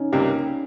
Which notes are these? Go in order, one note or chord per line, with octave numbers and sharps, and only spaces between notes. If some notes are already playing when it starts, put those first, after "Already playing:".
Already playing: C#4 D#4
C#2 C3 G3 A#3